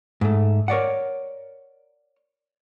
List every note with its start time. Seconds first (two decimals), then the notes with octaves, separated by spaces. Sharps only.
0.21 G#2 A3
0.68 A#4 C#5 D5 F#5